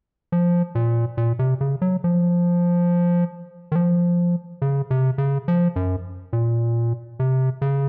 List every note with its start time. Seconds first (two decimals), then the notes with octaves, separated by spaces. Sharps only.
0.32 F3
0.75 A#2
1.17 A#2
1.39 C3
1.61 C#3
1.82 F#3
2.04 F3
3.72 D#3
3.76 F3
4.62 C#3
4.91 C3
5.18 C#3
5.48 F3
5.76 F#2
6.33 A#2
7.20 C3
7.62 C#3